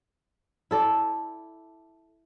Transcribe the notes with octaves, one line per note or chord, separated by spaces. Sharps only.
E4 A4 D5